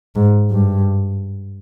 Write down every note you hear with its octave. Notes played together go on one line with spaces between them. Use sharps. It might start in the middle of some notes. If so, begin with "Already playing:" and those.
G#2
G2